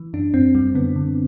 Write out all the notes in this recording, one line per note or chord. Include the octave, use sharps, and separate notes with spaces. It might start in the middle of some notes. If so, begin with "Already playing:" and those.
Already playing: E3
F#2 D4
F#2 C4
F#2 G3
D3 B3
D3